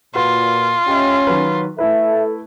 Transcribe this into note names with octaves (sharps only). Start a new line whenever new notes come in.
A#2 F4 F#4 B4
C#4 G4 D#5 E5
D#3 F#3 B4
A3 E4 A4 B4 E5